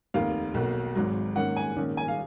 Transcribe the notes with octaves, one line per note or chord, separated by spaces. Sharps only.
F1 D#2 D#3 F5
B1 B2 A#3
G#1 G#2 F#3
G#2 D#3 A#3 C#4 F#5
G#5
A#1 G#2 D#3 A#3 C#4
G#5
F5